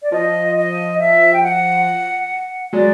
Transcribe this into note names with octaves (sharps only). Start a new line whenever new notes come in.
D5
F3 D#5
D#5
E5
G5
F#5
F#3 G#3 D5